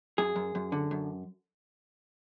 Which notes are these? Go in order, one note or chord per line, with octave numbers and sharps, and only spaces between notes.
F#2 G#4
F#2
F#2
D3
F#2